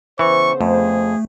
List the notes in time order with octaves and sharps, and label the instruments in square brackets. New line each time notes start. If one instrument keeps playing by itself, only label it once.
[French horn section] C#3 B3 C5 [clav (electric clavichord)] E3 [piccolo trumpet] C#6
[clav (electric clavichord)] F2 [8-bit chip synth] A3 [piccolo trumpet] G#4